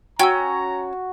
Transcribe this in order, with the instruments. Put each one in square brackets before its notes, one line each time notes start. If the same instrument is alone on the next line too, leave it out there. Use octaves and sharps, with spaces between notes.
[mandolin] C#4 [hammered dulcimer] F#4 [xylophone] G5 C#6 E6 [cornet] A#5